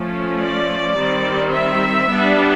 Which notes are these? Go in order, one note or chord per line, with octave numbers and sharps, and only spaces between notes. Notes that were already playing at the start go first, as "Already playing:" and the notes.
Already playing: F3 A3 C#4
D5
D#3 G3 C4
E5
G3 B3 D4